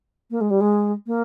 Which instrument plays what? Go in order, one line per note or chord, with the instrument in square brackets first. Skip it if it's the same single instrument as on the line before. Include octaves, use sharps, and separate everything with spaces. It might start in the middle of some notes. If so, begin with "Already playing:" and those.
[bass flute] A#3
G#3
G3
G#3
A#3